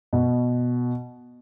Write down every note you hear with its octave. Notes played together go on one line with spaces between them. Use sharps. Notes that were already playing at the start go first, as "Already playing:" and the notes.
B2